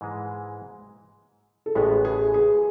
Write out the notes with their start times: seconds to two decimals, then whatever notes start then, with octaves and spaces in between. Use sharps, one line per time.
0.01 G#2 E3 G#3
1.66 A4
1.75 A1 A2 G#3 B3 G#4
2.05 G#4
2.34 G#4